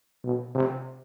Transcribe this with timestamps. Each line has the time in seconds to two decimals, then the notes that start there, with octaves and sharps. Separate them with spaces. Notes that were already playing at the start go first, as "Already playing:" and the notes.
0.24 B2
0.55 C3